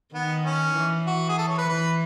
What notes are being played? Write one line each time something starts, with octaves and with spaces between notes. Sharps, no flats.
D#3 B3
C#4
E3
F#4
G#4
A4
C#5
B4
E3 B4